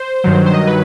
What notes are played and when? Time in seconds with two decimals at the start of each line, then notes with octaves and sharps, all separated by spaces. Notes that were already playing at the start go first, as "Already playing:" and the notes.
Already playing: C5
0.24 G2 D#3 F#3
0.46 C5
0.54 D#5
0.67 B4